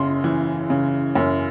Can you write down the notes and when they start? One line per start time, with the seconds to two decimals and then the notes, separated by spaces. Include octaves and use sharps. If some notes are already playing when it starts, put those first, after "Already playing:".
Already playing: F#2 C#3 C6
0.24 E3
0.70 C#3
1.15 F#2